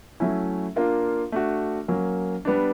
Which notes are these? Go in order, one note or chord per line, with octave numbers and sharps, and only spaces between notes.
F#3 A3 C#4 E4
A#3 D4 F4 A#4
A3 D4 F#4
F#3 A#3 C#4
G3 B3 D4